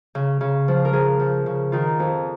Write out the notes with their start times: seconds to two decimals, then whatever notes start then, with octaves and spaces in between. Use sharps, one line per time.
0.15 C#3
0.41 C#3
0.68 F3
0.85 A#4
0.93 F3 G#4
1.20 F3
1.46 C#3
1.72 D#3 F4
1.99 F2